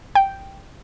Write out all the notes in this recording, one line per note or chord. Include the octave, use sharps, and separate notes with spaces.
G5